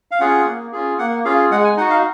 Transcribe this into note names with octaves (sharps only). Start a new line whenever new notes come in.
F5
C#4 F4 G#4 F#5
A#3
C#4 F4 G#4
A#3 F#5
C#4 F4 G#4 F5
G#3 F#5
G#5
D#4 F#4 F#5
F5